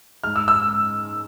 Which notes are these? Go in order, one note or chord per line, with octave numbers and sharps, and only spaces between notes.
G#2 F6
E6
E6